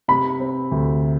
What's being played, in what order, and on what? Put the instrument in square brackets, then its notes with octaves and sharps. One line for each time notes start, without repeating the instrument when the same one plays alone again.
[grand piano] C3 [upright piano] B5
[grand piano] C4
D2